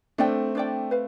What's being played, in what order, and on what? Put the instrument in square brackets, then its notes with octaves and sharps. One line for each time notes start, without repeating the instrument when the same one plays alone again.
[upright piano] A3 C4 [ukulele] D4 A4 D5 G5
[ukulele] D4 A4 D5 G5
B4 F5